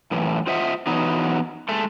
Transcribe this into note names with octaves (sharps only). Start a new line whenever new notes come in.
F#2 A2 E3
F4 C5 D#5 E5 F#5
E3 F#3 B3 D#4
G#3 A3 A4